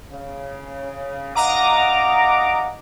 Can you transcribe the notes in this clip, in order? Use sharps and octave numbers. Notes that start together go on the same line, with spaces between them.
C#3
G2 D#5 F5 F#5 A#5 D6